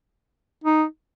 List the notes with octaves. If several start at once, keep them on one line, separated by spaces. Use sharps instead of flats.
D#4